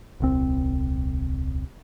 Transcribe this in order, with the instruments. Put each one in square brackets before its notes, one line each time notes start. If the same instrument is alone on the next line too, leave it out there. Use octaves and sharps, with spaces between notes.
[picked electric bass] D#1 C2 C4